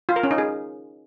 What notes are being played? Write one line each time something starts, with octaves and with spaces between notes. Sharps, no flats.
F4
A#4
C#4
D#4
G#4